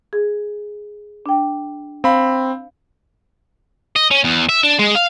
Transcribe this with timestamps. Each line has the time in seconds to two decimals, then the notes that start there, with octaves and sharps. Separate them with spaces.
0.13 G#4
1.26 D4 G5
2.04 C4 F5 B5
3.96 D#5
4.11 C#4
4.24 E2
4.49 E5
4.63 D4
4.79 G#3
4.95 F5